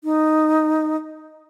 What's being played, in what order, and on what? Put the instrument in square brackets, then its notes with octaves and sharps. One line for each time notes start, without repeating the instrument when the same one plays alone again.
[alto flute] D#4